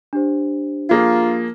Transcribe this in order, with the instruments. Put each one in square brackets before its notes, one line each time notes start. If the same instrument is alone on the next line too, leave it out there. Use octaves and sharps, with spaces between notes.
[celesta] D4 G4 C5
[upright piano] F3 A#3 G#4 [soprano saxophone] F4